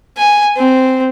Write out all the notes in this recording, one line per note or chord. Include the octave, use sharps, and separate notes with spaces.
G#5
C4